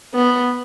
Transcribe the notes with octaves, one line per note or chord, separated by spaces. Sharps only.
B3